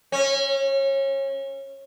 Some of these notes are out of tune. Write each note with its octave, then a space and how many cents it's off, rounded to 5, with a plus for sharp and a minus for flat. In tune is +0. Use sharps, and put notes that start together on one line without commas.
C#4 -25